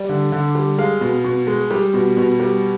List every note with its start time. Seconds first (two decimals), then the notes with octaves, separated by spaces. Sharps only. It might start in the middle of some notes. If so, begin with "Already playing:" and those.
Already playing: G3 D5
0.09 D3
0.32 D3
0.55 G3
0.78 G#3 F5
1.01 B2
1.24 B2
1.47 G#3
1.71 G3
1.94 B2
2.17 B2
2.40 G3